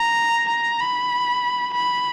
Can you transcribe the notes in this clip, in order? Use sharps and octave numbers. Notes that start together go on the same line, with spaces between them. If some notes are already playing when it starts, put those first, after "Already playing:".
Already playing: A#5
A#5
B5
B5